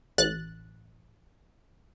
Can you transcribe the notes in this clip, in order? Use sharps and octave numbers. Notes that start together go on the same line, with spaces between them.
A1 F#6 A6